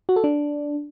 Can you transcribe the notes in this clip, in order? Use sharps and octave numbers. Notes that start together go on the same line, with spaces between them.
F#4
A4
D4